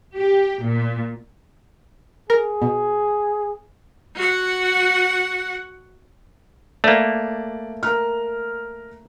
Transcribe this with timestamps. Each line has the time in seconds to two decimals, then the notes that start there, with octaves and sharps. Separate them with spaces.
0.15 G4
0.63 A#2
2.30 G#4 A#4
2.62 B2
4.16 F#4 F#5
6.84 A3 A#3 D5
7.83 A#4 A#5 F6